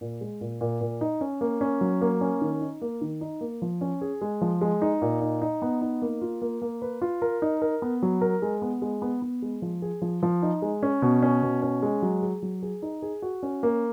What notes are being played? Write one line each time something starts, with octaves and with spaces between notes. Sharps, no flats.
A#2
G#3
A#2
A#2
A#2
D#4
C#4
A#3
C#4
F#3
A#3
C#4
D#3
D#4
A#3
D#3
D#4
A#3
F3
C#4
G#4
G#3
F3
G#3
D#4
A#2
D#4
D#4
B3
D#4
A#3
F4
A#3
A#3
B4
F4
A#4
D#4
A#4
B3
F#3
A#4
G#3
B3
G#3
B3
B3
G#3
F3
G#4
F3
F3
D#4
G#3
C#4
B2
C#4
B2
C#4
G#3
F#3
G#4
F#3
G#4
D#4
G#4
F#4
C#4
A#3